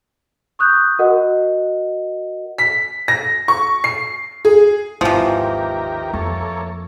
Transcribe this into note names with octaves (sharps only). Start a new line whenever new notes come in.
C#6 D#6 F#6 G6
F#4 A#4 D#5 F#5
B6
A#6
C#6
C7
G#4
G#1 D#2 E3 F3 G4 A#4
F2 A#3 A4 C#5